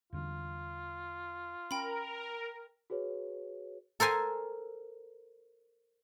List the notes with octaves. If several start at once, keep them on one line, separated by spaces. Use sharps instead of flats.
E2 D3 G3 F4
C#4 A#4 G5 B5
F#4 G#4 B4 C#5
A4 A#4 C5 G#5